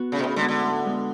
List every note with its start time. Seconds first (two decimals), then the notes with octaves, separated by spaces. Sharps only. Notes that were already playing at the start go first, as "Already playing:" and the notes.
Already playing: B3 F#4
0.12 A2 C#3
0.19 B2
0.24 C#3
0.36 D3 G#3
0.40 B3
0.48 D3
0.60 A2
0.85 G#3 B3